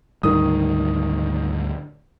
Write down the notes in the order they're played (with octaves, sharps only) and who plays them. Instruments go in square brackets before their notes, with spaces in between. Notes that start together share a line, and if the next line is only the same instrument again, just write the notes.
[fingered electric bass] D2 G#2 G3 [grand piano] D#3 D#6